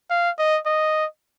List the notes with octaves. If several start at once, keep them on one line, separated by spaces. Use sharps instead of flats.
F5
D#5
D#5